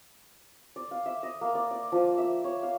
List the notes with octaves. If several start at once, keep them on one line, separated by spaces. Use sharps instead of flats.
D5
F5
E5
D#5
A#3
D5
D5
F3
E5
C#5
F5